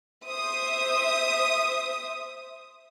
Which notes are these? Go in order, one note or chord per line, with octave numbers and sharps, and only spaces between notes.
C5 E5 D#6